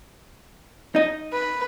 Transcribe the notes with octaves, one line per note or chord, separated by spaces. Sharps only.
D#4 D#5
B4